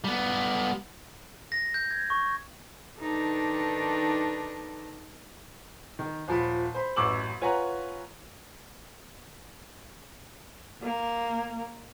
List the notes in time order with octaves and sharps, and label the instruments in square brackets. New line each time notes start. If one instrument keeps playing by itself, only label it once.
[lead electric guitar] G3 B3
[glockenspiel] A#6
G6
G#6
C#6
[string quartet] D#3 D4 D#4 G4 A4 B4
[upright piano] D#3
D#1 F3 B5
C5 B5
A1 F#2 C#6 D6 E6 F#7
F4 B4 C#5 F#5 G#5 A#5
[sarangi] A#3